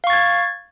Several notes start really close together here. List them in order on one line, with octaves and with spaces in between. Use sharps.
F5 C#6 A6 G#6